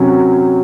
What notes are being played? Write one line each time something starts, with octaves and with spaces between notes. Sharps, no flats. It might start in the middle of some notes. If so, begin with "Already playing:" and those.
Already playing: C3 F#3 C#4